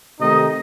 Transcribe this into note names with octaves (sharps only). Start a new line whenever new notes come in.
C3 D#3 A3 D#4 D#5